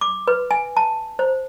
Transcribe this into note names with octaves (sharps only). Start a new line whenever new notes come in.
D6
B4
G#5
A5
C5